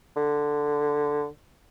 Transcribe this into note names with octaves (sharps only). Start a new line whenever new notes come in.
D3